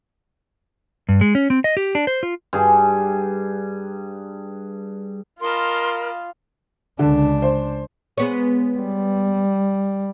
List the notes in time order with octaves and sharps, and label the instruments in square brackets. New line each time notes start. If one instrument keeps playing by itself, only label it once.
[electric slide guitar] G2
G#3
C#4
C4
D#5
G4
D4
C5
F4
[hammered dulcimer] G2 G#4
[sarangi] F4 [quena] A#4 [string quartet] D#5 A5 B5 [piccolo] C6
[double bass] C#2 D4 [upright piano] D3
[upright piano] C5
[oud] G#3 B3 C#5
[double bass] G3